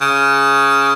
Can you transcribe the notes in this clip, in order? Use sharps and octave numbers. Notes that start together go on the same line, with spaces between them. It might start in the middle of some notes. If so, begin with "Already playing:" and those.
C#3